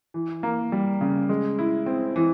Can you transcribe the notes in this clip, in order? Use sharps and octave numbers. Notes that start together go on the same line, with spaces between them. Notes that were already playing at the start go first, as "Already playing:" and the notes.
E3
A#3
G3
C#3
G#3
E4
C4
E3